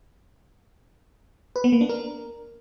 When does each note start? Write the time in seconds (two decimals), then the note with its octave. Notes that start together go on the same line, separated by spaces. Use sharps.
1.56 B4
1.64 B3
1.73 A#3
1.81 D4
1.89 A#4